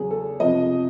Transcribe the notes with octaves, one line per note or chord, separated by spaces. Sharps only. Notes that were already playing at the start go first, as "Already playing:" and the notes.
Already playing: E2 C#3 F#3 G#4
A4
F2 C3 F3 D#5